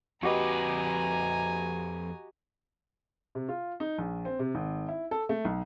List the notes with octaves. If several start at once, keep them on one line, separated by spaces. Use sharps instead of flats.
F2 F#4 G4 B4 D#5 G#5 A#5
C3
F4
D#4
A#1
C4
C3
G#1
E4
A4
A3
B1